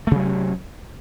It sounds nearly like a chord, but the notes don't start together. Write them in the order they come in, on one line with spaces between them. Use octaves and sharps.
A3 C3 F#3 C#4